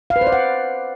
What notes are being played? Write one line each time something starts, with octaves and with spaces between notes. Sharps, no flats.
F5
B4
C5
D5
F#5